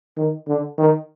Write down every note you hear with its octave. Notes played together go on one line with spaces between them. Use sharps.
D#3
D3
D#3